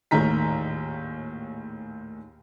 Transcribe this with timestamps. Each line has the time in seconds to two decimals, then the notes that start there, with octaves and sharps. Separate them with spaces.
0.11 A#1 D#2 A2 D#3 A#5 B6